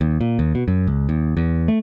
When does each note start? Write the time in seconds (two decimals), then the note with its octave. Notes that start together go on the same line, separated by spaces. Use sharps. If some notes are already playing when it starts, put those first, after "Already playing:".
0.01 D#2
0.21 A#2
0.39 D#2
0.55 B2
0.68 F#2
0.87 C#2
1.09 D#2
1.37 E2
1.68 A3